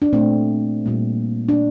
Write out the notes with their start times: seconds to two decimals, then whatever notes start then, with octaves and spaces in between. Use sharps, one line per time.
0.02 D4
0.13 A#2 A3 C4
0.86 A#2 G3 A#3
1.49 D4